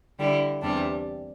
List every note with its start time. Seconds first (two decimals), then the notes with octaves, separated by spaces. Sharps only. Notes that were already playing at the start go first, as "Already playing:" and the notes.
0.19 D3 G3 E4
0.62 E2 C3 G3 D4